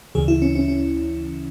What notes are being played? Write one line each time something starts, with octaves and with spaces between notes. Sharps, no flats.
D2 C#3 E3 G#4
E4
C#4
C#4
C#4